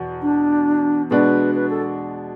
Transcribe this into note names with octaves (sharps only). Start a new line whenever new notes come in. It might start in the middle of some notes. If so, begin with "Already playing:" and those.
Already playing: E2 B2
D4
B2 G#3 D4 B4
B4
A4